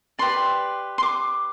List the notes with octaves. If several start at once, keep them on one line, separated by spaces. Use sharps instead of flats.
G4 B4 D5 C6
C6
D6